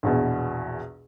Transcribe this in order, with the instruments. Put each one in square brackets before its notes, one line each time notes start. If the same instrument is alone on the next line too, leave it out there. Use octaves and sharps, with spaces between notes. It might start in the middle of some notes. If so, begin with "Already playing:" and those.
[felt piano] A#1 E2 B2